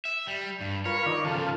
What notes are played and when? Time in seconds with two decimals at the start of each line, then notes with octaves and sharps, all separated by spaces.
0.05 E5
0.27 G3
0.61 G2
0.85 F4 A#4 B4 C#5
1.06 D#3 A#4 D5
1.25 C#3 F3 F4 A4